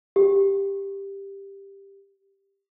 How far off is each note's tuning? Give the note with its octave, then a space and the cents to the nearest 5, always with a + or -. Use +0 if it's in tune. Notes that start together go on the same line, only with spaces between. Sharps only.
G4 +10